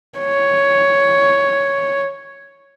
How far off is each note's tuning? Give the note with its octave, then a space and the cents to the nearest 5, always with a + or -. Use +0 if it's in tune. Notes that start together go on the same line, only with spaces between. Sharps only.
C#5 +5